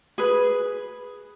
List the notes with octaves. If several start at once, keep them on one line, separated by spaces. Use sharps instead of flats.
G#4 B4